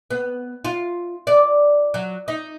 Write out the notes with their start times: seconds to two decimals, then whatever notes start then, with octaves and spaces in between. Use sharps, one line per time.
0.10 B3
0.64 F4
1.27 D5
1.94 F#3
2.28 D#4